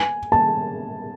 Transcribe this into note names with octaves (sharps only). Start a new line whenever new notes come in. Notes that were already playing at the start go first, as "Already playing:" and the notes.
Already playing: G#5
A5